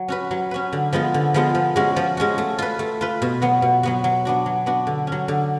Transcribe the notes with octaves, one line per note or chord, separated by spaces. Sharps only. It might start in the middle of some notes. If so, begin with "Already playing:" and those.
Already playing: F#3
C#4 F#4 B4
F#3
C#4 F#4 B4
D3
F3 G#3 B3 F4
D3
F3 G#3 B3 F4
F3
G#3 C#4 F#4
F3
G#3 C#4 F#4
A3
F4 B4
A3
F4 B4
B2
F#3 B3 F#4
B2
F#3 B3 F#4
F#3
B3 D4 F#4
F#3
B3 D4 F#4
D3
F#3 C#4
D3